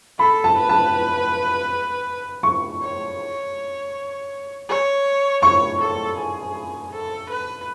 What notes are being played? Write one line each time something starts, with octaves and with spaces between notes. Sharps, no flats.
A4 B5
A5
B4
A5
C#6
C#5
C#5
C#5 C#6
A4
G#4
A4
B4